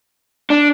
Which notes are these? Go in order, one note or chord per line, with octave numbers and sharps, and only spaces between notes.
D4